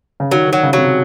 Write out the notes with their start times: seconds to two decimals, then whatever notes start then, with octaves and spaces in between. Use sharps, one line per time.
0.20 C#3
0.31 D#3 F#3
0.48 D#3 F#3
0.63 C#3
0.73 F#3
0.78 C3